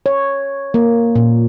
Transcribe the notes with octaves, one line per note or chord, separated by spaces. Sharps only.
C#5
A#3
A#2